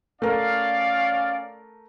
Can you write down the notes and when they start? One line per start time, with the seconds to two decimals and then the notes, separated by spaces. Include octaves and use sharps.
0.22 A3 C#4 A#4 D5 F5